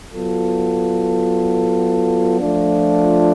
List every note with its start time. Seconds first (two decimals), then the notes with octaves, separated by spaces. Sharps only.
0.12 F#3 B3 F4 A4
2.39 F3 A3 D4 F4